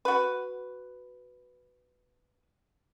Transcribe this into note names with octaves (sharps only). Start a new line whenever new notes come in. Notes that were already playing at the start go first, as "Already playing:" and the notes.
F#4 B4